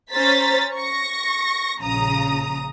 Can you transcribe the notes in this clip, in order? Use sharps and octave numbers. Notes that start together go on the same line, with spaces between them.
C#4 C5 A#5 A6 B6
C#6 A#6
A#1 C#3 A#5 D#6